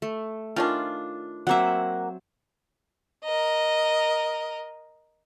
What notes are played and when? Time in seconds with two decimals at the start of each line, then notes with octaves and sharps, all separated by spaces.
0.02 A3
0.56 D#3 C#4 D4 F4
1.47 F#3 A#3 C4 E5 F#5
3.24 A#4 D#5